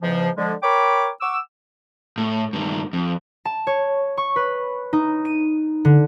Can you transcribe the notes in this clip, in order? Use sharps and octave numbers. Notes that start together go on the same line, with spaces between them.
E2 G#2 C#3 F3
D3 F3 G#3
A#4 C#5 G5 B5 D6
F#5 C#6 D6 E6
A2
G2 D#3
F2
A5
C#5
C#6
B4
D#4
D#7
D3